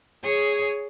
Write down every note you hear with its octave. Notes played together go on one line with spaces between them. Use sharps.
G#4 C#5